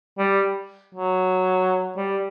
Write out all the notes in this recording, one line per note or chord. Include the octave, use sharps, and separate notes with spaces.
G3
F#3
G3